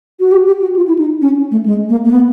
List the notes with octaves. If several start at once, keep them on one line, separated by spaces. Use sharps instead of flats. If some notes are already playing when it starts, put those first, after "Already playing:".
F#4
G4
G4
F#4
F4
E4
D#4
C#4
A3
G#3
A#3
A#3
B3